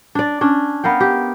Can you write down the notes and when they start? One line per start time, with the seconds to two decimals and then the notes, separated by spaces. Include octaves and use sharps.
0.15 D4 D5
0.41 C#4 D4
0.84 B3 A#4 F5 G5
1.01 G4